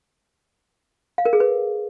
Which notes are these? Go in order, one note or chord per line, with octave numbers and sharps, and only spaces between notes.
F5
A#4
G#4
B4